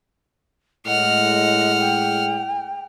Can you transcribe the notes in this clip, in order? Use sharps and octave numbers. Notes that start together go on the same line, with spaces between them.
A2 G#3 D#5 F#5 F6
G5